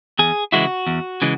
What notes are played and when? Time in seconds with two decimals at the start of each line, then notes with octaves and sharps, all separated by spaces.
0.19 E2 G#4
0.52 C#3 E3 G#3 E4 F#4
0.87 E2
1.22 C#3 E3 G#3